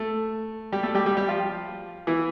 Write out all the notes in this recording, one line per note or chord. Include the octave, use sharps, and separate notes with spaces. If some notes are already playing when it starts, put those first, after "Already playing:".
Already playing: A3
G3 G4
A3 A4
G3 G4
G3 G4
G3 G4
F3 F4
E3 E4